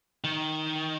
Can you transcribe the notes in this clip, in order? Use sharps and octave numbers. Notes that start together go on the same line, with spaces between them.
D#3